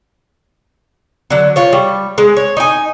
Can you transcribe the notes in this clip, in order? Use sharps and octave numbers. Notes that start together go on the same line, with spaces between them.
D3 F#3
F4 C#5
G3
G#3
C#5
D#4 G#5